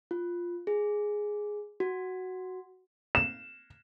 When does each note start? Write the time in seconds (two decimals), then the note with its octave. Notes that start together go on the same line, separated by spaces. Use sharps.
0.11 F4
0.67 G#4
1.80 F#4
3.15 E7